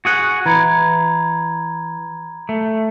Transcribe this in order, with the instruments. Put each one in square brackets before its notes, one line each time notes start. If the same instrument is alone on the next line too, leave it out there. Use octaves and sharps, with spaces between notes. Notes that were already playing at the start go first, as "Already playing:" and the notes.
[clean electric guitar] F#4 G#4 F#5
[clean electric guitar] E3 [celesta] A#5 B5 G#6
[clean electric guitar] A3